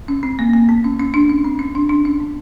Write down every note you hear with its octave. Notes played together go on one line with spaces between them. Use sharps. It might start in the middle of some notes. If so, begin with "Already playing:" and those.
C#4
C4
A#3
A#3
B3
C#4
C#4
D4
C#4
C4
C#4
D4
D4
C#4
B3